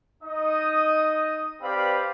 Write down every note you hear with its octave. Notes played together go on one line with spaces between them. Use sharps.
D#4 D#5 D#6
C4 G4 B4 D5 F5 B5